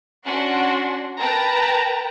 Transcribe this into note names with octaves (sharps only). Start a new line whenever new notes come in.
C#4 D4 F#4 F#5 C6
A#4 B4 G5 A5 A#5